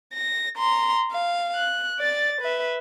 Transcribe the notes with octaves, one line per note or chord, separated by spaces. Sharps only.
A#6
A#5 C6
F5
F#6
D5 A6
B4 E5